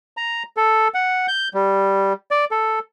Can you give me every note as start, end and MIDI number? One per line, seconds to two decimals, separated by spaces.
0.17 0.43 82
0.57 0.88 69
0.94 1.27 78
1.28 1.48 91
1.54 2.13 55
2.31 2.45 74
2.51 2.79 69